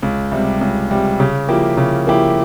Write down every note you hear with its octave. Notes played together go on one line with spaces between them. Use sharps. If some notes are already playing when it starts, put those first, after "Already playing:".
C#2
C3 G3
C#2
C3 G3
C#3
F3 A#3 E4 G4
C#3
F3 A#3 E4 G4